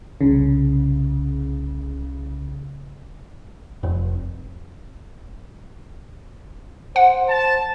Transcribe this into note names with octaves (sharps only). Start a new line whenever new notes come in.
C2 C#3
F1
C5 F#5
A5